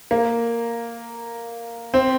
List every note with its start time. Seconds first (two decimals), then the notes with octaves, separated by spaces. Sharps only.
0.11 A#3
1.94 C4